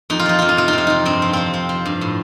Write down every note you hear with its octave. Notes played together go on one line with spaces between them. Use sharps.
F2 D#4
F4
F3 D#4
F2 F4
D#4
C3 F4
D#4
C3 F4
F2 D#4
G2 C4
F3
F3 C4
F3
F3
G2
A2